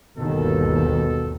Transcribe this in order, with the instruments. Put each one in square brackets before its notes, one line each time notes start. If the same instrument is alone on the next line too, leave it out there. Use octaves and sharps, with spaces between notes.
[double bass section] G1 D#2 D#3 [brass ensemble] B2 A4